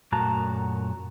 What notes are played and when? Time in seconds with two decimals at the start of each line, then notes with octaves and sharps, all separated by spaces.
0.12 F#2 A#2 A3 F#4 A5 A#5